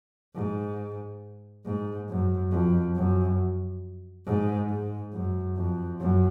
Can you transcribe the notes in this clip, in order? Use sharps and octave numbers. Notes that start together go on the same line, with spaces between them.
G#2
G#2
F#2
F2
F#2
G#2
G#2
F#2
F2
F#2